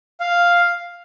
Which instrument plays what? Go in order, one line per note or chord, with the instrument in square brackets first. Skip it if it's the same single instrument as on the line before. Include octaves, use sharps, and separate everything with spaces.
[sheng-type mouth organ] F5